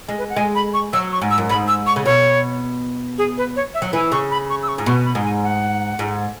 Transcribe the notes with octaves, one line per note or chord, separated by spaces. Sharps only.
G#3
B4
F#5
G#3 G#5
B5
C#6
F#3 E6
C#6
G#2
E6
F#2
G#2 B5
E6
C#6
C#3
B2 C#5
G#4
B4
C#5
E5
F#3
E3 G#5
C#3 C#6
B5
C#6
E6
C#6
G#2
B2 C#6
B5
G#2
G#5
F#5
G#2